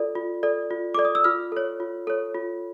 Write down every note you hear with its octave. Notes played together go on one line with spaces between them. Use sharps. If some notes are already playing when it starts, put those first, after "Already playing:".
Already playing: F4 A4 D5
F4
A4 D5
F4
A4 D5 D6
D#6
E6
F4 F6
A4 C#5
F4
A4 C#5
F4